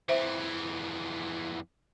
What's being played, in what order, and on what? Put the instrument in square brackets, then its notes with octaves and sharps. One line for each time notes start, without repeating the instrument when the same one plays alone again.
[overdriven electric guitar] F2 E3 [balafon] C5 E5